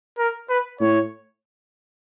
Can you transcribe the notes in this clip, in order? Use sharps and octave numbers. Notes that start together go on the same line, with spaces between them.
A#4
B4
A2 C#5